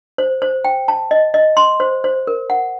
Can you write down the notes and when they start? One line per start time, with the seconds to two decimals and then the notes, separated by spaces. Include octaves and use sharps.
0.18 C5
0.42 C5
0.65 G5
0.88 A5
1.11 D#5
1.34 D#5
1.57 C6
1.80 C5
2.04 C5
2.27 A#4
2.50 F#5